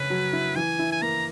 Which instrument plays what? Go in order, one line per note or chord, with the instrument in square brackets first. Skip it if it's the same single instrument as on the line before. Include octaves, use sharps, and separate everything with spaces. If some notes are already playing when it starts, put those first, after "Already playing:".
Already playing: [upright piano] C#3 C#4 [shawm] B4
[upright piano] F#3
E4
[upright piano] E3 [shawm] G#5
[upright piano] E4
[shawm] G#5
[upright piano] A#3 [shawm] A#5